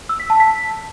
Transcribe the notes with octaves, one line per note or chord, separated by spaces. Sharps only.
E6
B6
A5
B6